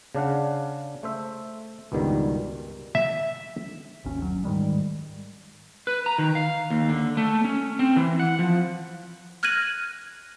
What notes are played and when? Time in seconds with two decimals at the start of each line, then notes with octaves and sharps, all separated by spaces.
0.15 C#3 D4 F5 F#5
1.03 A3 C5 E5
1.92 C#2 G2 B2 D#3 G3
2.95 E5
4.04 G#1 D#2 C#4
4.22 G1 F#3
4.44 G#2 D#3 G3 G#3
5.87 B4
6.06 A#5
6.18 D#3
6.35 F5
6.70 D#2
6.89 D3
7.17 A3
7.44 C#4
7.79 C4
7.96 E3
8.20 F#5
8.39 F3
9.43 F6 F#6 G#6 A#6 D#7 F#7